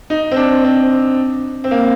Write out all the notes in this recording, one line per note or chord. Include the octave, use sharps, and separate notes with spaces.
D#4
C4
D4
C4
C4
A#3